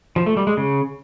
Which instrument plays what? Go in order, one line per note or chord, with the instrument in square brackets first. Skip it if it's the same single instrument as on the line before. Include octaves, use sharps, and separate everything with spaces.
[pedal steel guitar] F3
A3
G3
G#3
C#3